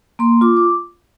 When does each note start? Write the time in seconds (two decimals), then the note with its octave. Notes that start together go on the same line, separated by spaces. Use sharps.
0.19 A#3 C6
0.41 F4 D6
0.57 D6